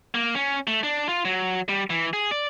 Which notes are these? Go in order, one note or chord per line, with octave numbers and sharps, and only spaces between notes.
A#3
C#4
A3
D4
F4
F#3
G3
E3
G#4
D5